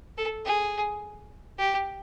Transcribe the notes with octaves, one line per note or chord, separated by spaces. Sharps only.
A4
G#4
G4